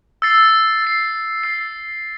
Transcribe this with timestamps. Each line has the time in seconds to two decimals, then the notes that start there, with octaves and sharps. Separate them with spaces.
0.22 E6 A6 C7
0.82 E6 A6 C7
1.43 E6 A6 C7